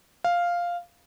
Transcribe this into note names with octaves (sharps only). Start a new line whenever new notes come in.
F5